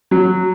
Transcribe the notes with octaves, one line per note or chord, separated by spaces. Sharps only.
F#3